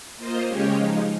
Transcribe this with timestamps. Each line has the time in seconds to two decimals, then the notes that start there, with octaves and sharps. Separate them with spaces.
0.17 A#3 F4 C5 D#5
0.46 C#3 G#3 C#4 G4 C#5
0.76 F3 G#3 D#4